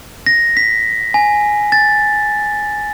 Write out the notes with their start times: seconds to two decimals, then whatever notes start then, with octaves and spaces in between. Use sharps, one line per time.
0.26 A#6
0.57 B6
1.14 G#5
1.72 A6